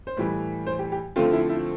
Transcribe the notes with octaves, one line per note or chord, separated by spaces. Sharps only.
C5
A2 E3 G3 B4
C5
G4
G4
D3 F3 A3 C4 F4
E4
E4